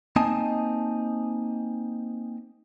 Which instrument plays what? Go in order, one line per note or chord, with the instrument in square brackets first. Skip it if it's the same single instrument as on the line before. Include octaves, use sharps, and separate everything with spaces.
[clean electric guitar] A#3 C4 D#4 D#5 G#5 A5